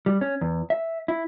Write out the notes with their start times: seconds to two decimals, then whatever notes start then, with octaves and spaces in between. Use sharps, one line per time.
0.06 G3
0.21 C#4
0.41 E2
0.70 E5
1.08 E4